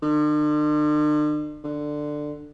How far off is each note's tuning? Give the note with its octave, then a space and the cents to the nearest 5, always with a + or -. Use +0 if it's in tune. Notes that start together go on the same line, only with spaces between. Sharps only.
D3 +45
D3 +15